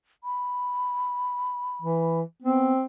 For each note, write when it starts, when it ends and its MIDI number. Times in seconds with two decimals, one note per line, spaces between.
0.24 2.19 83
1.82 2.22 52
2.42 2.73 59
2.42 2.84 60